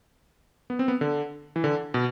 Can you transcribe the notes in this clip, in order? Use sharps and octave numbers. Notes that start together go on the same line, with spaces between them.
B3
C4
B3
D3
E3
D3
B2